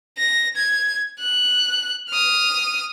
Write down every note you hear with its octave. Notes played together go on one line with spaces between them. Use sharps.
A#6
G#6
F#6
D#6 F6